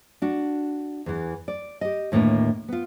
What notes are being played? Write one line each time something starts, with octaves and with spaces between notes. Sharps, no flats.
D4 F#4
E2 E3
D5
G4 D#5
D#2 A2 D3 A#3 B4
B3 F4